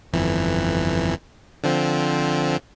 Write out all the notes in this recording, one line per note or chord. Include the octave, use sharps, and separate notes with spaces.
G1 F2 E3
D3 F3 C4